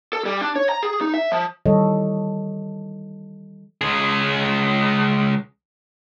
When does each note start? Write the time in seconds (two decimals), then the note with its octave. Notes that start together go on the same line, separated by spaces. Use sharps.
0.13 A4
0.25 G3
0.41 D4
0.56 C#5
0.69 A#5
0.83 G#4
1.01 D#4
1.14 E5
1.32 F3
1.66 D#3 E3 G3 A4 C#5 D#5
3.81 C#2 G#4